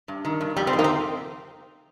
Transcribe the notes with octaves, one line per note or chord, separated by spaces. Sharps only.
G2
D#3
G2
F2 G3
G3 C4
D#3
A#3 D#4
C4